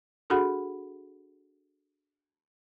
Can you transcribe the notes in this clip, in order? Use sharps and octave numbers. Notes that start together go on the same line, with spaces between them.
D4 F#4 G#4 A4 F#5 B5